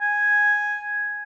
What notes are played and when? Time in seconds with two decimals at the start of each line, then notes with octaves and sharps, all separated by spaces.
0.01 G#5